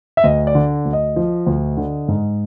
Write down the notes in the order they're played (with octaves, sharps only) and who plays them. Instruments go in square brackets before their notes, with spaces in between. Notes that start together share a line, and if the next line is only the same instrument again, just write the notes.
[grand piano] E5
D2 D#5
D5
D3
D2
D#5
F3
D2
D3
G#2